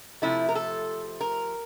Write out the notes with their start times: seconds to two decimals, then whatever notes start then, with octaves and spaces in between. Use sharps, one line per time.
0.22 C3 F3 A3 E4
0.49 A#4
0.55 A4
1.21 A#4